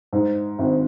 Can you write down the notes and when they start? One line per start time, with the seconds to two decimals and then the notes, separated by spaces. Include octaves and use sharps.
0.13 G#2
0.59 G#1